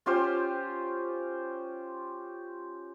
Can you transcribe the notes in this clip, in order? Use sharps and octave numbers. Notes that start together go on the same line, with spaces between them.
C#4 F4 G4 C5